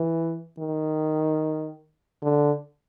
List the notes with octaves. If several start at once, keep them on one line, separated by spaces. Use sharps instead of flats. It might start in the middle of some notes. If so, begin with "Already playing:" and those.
Already playing: E3
D#3
D3